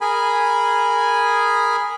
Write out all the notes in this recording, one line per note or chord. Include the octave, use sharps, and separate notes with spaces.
G#4 A#4 G#5 B5